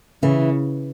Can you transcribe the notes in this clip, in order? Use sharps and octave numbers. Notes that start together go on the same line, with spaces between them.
C#3 E3